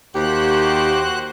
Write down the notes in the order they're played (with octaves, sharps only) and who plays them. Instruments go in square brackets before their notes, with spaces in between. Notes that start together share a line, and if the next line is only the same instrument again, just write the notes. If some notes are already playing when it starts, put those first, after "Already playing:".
[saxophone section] D#2 G4 [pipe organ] F#4 C5 F#6